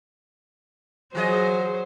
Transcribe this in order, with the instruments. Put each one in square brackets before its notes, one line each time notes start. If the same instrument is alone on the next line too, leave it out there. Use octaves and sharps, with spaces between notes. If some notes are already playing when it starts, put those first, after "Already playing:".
[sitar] E3 G#4 D#5 [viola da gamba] F#3 C5